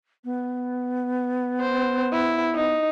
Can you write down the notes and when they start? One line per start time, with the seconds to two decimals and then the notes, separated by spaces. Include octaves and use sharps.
0.24 B3
1.61 C5
2.13 E4
2.54 D#4